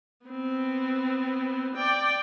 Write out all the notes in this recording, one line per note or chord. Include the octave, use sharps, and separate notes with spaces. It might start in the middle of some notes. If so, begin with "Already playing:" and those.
B3 C4
D5 G5